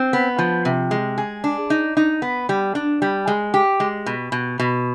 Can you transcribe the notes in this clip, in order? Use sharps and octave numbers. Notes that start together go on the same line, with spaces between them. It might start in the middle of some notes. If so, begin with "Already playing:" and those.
Already playing: C4
B3
F3
C3
G#3
G#4
D4
D#4
D#4
B3
G3
D4
G3
G#3
G4
G#3
B2
B2
B2